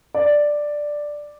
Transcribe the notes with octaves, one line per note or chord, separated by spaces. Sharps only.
D5